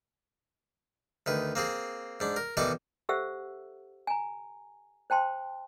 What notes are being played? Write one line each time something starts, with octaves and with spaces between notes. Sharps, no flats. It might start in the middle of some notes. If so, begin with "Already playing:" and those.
D2 D#3 B4
A#3 C4 G#4
G#2 D4
A#4
B2 D#3 E3 A4 D5 C#6
G4 A4 C5 E5 F#5 E6
G#5 A#5
C5 G5 A5 C6